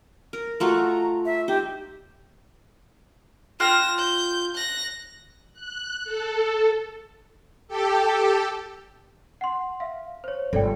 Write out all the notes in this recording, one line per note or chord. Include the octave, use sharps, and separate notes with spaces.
A#4
A3 F4 F#4 A#5
E5
D#4 G4 C5
F4 G5 F#6 A#6 E7
G6
F#6 A#6
F#6
A4
G4 A4
F#5 C6
E5 F5
C5 C#5
G1 A4 D5 G5